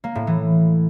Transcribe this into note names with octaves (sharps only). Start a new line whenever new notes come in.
A#3
A2
E3